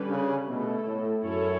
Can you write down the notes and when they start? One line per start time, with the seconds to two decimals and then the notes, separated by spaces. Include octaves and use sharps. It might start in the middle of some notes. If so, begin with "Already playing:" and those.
Already playing: D3 G3 C#4 G4 B4
0.09 C#3
0.48 B2 A3 E4 A4
0.86 A2
1.23 F#2 C#4 E4 A4 C#5